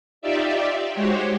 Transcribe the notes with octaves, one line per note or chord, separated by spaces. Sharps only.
D#4 F4 G4 D5 E5
G#3 F#4 G4 C5 C#5